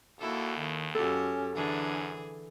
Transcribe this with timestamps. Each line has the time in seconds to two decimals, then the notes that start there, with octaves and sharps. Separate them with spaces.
0.20 D#2 A#3 E4 F#4 A4
0.57 D#3
0.95 F#2 C#4 F#4 G4 A4
1.55 F#2 D3 E3 D4 G#4